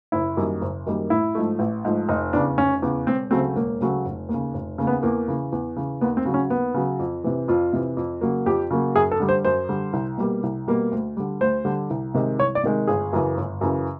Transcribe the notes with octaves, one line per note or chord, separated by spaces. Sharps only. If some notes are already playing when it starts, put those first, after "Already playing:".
F#1 E4
F#2 D#3 G3 A#3
F#1
F#2 D#3 G3 A#3
A1 E4
G#2 F3 A3
A1
G#2 F3 A3
F1 D#4
E2 C#3 D4
F1 C#4
E2 C#3
E1 C4
D2 C#3 F#3 A3 C4
E1 A#3
D2 C#3 F#3 A3
F1
D#2
C#3
F1
D#2 C#3
B3
E2 A#3
C#3 E3
E2
C#3 E3
D#2 B3
C4
C#3 F#3
C#4
D#2 B3
C#3 F#3
F2
C3 E3
F2 F4
C3 E3
F2
C#3 F#3 A#3
F2 G4
C#3 F#3 A#3
F#2 G#4
A4
D3 G3
C5
F#2 C5
D3 G3
C2
B2 G3 A#3
C2
B2 G3 A#3
D2
D3 G3
D2 C5
D3 G3
C2
C3 D#3 G#3
C2 C#5
D5
C3 D#3 G#3
G1 G#4
F#2 C#3 E3
G1
F#2 C#3 E3